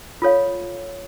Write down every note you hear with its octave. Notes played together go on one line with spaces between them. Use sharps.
F4 A4 C#5 F5